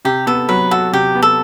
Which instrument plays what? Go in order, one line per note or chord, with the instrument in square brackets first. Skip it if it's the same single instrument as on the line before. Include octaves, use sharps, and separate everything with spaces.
[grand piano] C3 [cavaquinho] G4
[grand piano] B3 [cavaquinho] A4
[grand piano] F#3 [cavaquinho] B4
[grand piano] F#4 [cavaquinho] A4
[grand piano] C3 [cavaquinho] G4
[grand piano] B3
[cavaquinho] A4